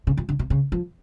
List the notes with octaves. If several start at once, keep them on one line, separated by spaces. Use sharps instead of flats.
C#3
F3
D3
B2
C#3
F3